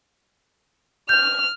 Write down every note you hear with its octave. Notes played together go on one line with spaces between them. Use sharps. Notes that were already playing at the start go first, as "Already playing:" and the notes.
F6 G6